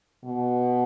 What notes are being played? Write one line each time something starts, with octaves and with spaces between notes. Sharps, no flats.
B2